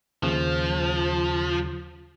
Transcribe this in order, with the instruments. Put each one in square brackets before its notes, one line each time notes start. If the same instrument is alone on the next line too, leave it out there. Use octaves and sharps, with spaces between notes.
[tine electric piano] D#2 C#3 [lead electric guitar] F3